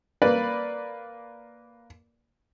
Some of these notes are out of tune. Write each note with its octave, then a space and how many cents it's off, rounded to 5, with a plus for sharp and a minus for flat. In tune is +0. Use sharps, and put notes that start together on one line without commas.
A#3 +0 B4 +0 D5 +0